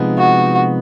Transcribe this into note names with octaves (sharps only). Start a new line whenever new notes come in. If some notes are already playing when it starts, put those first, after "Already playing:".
Already playing: C3 F3 G#3 B3 D#4
F#4